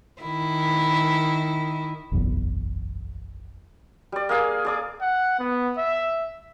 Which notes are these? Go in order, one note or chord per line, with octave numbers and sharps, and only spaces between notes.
D#3 E4
F#1 B1 E2
G3 D5
A#3 G#4 F5 G#5
G#4 D5 D6
F#5
B3
E5